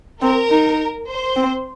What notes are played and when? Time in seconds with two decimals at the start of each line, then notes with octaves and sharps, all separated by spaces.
0.22 C4 A#4
0.50 D#4
1.08 C5
1.36 C4